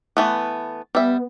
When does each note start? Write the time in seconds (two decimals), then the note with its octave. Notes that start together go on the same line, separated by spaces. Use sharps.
0.17 E3 A3 B3
0.95 G3 B3 E5